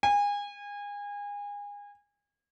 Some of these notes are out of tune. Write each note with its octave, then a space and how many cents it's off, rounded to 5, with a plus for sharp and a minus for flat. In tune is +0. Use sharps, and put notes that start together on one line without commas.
G#5 -30